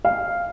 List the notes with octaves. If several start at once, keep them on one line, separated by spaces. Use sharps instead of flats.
F5